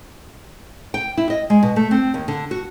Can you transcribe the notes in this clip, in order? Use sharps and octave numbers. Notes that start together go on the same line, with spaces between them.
G5
E4
D#5
G#3
B2
A3
C4
D#2
D3
F#4